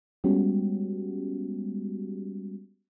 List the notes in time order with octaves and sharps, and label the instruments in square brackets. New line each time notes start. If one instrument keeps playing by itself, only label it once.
[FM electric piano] G3 G#3 B3 C#4 F#4 G4